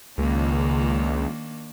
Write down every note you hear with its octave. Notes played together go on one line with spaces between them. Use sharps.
C#2 D#3 A#3 D4